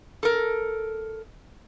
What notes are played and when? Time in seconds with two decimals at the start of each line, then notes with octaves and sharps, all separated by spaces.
0.23 A4 A#4